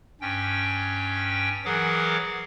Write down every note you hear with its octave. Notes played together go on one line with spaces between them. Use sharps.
G2 C#4 G5
E3 F#3 G#4 A#4 F#5 D6